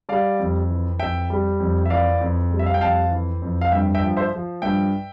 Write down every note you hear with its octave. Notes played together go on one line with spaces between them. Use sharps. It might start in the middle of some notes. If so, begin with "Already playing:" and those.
G3 D5 F5
F2
E3
F2 E5 G5
G3
F2
E5
E3 D5 F5
F2
G3
E5
F5
G5
F2 F5 A5
E3
F2
F5
G2 E5 G5
E5 G5
F3
C5 E5
F3
G2 E5 G5